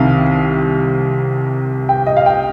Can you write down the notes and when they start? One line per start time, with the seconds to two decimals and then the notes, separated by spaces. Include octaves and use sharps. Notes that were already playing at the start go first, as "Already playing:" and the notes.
Already playing: C2 C3 D#3 F5
1.89 G5
2.07 D#5
2.17 F5
2.26 G5